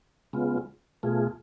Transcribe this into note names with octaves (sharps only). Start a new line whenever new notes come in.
C#3 G#3 B3 F4
B2 A3 F4 G#4